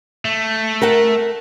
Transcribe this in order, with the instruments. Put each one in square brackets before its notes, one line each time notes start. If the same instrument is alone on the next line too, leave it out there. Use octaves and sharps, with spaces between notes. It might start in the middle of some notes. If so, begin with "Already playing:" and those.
[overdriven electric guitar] A3
[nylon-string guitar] A#4 E5 F#5